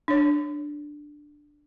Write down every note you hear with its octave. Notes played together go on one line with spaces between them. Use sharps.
D4 C#5